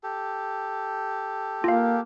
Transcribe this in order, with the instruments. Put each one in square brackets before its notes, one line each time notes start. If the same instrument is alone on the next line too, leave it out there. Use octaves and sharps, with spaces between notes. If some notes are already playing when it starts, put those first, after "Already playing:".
[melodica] G4 A4
[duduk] A#3 [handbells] F4 F5